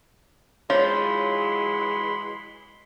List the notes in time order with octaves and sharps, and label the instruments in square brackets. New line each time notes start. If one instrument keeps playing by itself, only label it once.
[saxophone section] E3 F#3 G#3 [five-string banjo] F4 C5 [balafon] C#5 [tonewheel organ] B5 C6